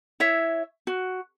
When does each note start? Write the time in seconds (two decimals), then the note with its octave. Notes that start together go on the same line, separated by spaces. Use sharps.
0.20 E4 C#5 E5
0.87 F#4